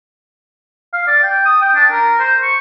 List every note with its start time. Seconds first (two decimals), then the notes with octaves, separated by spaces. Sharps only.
0.93 F5
1.07 D5
1.23 G5
1.45 D#6
1.61 G5
1.75 D4
1.92 A#4
2.19 C5
2.42 C#6